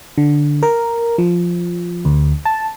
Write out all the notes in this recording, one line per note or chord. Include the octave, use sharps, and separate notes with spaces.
D3
A#4
F3
D2
A5